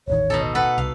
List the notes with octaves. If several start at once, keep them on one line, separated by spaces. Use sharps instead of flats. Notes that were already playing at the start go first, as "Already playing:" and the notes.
D#1 A1 D#3 C#5
B2 D#4 A4
A4 B4 F#5
C2 F5